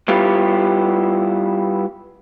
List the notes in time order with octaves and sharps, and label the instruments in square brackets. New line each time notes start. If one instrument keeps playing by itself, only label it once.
[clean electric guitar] G3 B3 E4 F4 G4